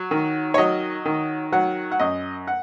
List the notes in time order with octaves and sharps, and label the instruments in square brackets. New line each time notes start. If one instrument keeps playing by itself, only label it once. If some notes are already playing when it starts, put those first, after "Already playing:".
Already playing: [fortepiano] F#3
D#3
C#5
F#3 D#5
D#3
F#3 F#5
F#5
F#2 D#5
F#5